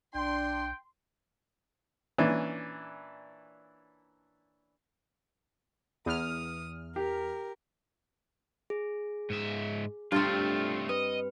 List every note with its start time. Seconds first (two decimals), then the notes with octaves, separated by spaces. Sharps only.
0.15 B1 D4 G5 C6
2.18 A#2 E3 C#4 D4
6.06 E2 D#6 F6
6.96 G4 A#4
8.70 G#4
9.30 G#2 E5
10.12 G2 A3 C4 F4 F6 A6
10.89 B4 D#5